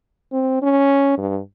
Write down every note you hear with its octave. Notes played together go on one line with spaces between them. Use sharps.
C4
C#4
G2